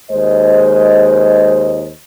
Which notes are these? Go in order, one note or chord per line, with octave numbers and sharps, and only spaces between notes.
D#2 G#3 C5 D#5